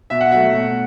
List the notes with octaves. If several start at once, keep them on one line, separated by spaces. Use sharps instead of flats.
B2 E5
F#5
F#3 A3 E5
B2